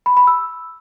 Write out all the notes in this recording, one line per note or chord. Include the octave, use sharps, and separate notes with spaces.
B5
B5
E6